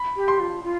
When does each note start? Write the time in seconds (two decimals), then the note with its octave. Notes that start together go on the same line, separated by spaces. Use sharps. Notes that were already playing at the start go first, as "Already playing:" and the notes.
Already playing: B5
0.16 G4
0.28 C6
0.40 F4
0.63 F4